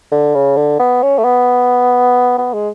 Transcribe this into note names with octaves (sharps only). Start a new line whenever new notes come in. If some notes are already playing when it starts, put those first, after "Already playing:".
D3
C#3
D3
B3
C#4
A3
B3
B3
G#3